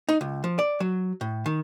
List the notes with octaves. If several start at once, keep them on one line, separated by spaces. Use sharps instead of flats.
D#4
C#2
F3
D5
F#3
A2
D#3